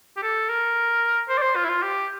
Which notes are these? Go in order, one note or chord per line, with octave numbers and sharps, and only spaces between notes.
G4
A4
A#4
C5
D5
C5
F4
E4
F4
G4